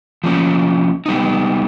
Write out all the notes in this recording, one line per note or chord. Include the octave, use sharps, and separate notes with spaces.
F3 A#3 C#4
G3 B3 D#4